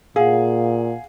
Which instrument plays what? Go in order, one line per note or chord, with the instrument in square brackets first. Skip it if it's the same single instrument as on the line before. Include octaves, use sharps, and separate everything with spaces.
[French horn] A#2 [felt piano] G#4 [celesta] F5 F#5